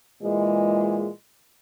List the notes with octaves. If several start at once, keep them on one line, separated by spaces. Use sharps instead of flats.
A#2 E3 G#3